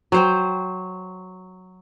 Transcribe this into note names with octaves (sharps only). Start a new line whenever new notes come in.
F#3 C5 G5